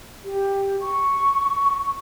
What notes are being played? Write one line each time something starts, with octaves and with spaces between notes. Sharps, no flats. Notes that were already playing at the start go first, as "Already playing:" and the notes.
G4
C#6